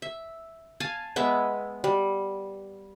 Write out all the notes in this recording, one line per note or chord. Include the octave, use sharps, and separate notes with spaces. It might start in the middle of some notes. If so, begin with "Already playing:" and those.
E5
F5 G#5 A5
G#3 B3 E5
G3